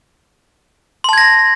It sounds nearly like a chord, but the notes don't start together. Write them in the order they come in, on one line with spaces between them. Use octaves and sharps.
C6 A5 G#6 A#6